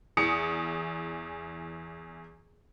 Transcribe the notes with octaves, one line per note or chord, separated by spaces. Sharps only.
E2 E3 D#6 C#7